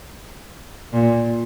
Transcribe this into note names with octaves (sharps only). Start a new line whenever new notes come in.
A#2